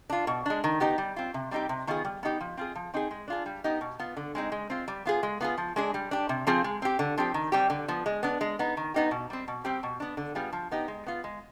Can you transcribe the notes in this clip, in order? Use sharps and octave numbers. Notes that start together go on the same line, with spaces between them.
D4 F4
B2
G#3 D4
D#3
B3 D#4 G4
G3
C4 F4
C3
G3 C4 D#4 G4
C3
D#3 B3 F4 G#4
G3
B3 D#4 G4
F3
C4 F4 G#4
F3
C4 D#4 G#4
G#3
D4 F4 G#4
G3
B3 D#4 G4
B2
B3 F4
D3
G#3 C4 D#4 G#4
G#3
C4 F4
G3
B3 F4 G#4
G#3
B3 F4 G#4
F3
G#3 D4 G#4
G3
D4 G4
C3
F3 C4 F4 G#4
G#3
C4 G4
D3
F3 C4 G4
D#3
G3 C4 G4
D3
F3 B3
G#3
B3 D4
G#3
B3 D#4
D#3
B3 D#4 G4
B2
G3 C4
B2
G3 C4 G4
B2
B3 D4
D3
G3 B3 F4 G#4
F3
B3 D#4 G4
G#3
B3 F4
G#3